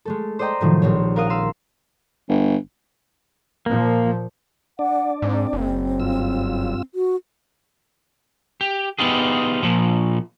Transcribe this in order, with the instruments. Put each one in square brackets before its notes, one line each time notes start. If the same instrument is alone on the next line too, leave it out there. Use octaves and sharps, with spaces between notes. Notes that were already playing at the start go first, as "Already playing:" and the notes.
[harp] G#3 A3 A4
C5 D5 D#5 G5 A#5
A2 C3 D#3 F3 F#3 A3
A#1 G3 C4 C#5
A#4 F5 F#5 D#6 F6
F5 C6 E6
[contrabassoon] G1
[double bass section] A#2 F3 [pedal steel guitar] A#3
[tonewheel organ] D4 D5 [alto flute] F#5
[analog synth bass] G#2 [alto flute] C4
[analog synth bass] F#1
[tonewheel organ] G2 F4 E6
[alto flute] F#4
[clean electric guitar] G4
B3 D#4 F4 G4 G#4
A#2 F3